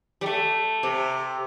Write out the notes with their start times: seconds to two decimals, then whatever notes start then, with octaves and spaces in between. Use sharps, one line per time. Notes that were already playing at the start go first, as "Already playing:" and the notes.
0.21 G3
0.26 A3
0.83 C3